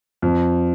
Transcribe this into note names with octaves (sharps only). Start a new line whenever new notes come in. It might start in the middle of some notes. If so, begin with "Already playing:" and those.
F2